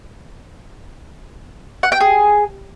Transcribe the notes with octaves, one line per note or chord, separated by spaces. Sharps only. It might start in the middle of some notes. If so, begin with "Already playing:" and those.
F#5
G5
G#4